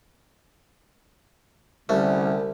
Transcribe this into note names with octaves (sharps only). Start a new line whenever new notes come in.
C2 D3 G3 A3 C#4